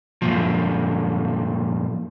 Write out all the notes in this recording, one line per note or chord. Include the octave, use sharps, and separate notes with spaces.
F#2 A#2 F3